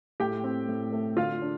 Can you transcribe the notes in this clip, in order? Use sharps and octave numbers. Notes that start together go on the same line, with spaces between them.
A2 G4 G5
C4
A2
A3
D3 F4 F5
D4